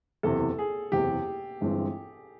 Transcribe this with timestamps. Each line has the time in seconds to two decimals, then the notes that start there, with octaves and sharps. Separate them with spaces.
0.23 F#1 E2 C3 A4
0.59 G#4
0.92 F#1 E2 C3 G4
1.61 G1 G2 E3 G#3 C4